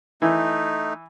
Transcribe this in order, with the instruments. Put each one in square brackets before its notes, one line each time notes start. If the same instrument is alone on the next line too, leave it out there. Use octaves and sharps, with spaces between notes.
[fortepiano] E3 [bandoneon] A3 D#4